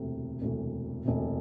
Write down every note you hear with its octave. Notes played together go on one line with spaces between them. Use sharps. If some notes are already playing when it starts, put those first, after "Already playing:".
Already playing: E1 D2 C3
E1 D2 C3
E1 D2 C3